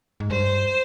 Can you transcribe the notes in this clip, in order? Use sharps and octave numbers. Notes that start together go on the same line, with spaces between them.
G#2
G2 C5